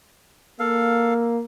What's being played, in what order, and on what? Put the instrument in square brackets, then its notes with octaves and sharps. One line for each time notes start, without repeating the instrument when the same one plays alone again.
[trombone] A#3 [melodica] A4 F5